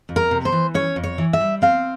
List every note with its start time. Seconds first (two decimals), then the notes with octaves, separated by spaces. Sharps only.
0.09 F2
0.16 A#4
0.31 C3
0.45 C5
0.52 E3
0.74 C#4 C#5
0.96 F2
1.04 C#5
1.18 E3
1.33 E5
1.41 G3
1.62 C4 F5